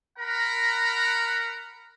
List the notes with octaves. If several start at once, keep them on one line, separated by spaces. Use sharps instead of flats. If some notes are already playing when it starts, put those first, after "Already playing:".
A#4 F#5 A#5 B5